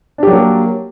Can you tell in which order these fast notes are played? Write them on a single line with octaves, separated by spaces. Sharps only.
D4 G4 F#3 A#3